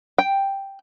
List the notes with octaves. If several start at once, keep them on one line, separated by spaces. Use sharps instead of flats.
G5